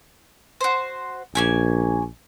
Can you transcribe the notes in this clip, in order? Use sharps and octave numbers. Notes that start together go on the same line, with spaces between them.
F#4 C5
A#1 A#3 C#4 G#5